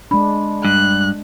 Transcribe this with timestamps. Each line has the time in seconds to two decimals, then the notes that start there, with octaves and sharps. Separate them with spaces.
0.11 G#3 D4 B5
0.65 G2 F#6